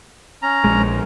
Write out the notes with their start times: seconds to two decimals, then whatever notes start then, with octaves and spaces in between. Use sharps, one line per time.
0.42 C#4 A#5
0.64 A#1 G#3